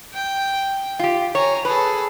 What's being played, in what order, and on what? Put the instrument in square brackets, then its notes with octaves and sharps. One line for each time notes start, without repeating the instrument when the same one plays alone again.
[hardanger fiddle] G5
[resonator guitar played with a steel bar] F4 G4
[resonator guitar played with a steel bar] C#5 [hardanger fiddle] G#5 A#5
[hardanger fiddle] G#4 A4 [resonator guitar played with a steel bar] B4